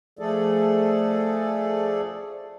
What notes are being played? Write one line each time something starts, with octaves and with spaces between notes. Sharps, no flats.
F3 A3 G#4 A4 D5